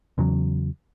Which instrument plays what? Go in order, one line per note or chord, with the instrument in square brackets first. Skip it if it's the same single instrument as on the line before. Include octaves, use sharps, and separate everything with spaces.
[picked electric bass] E2 C#3 F#3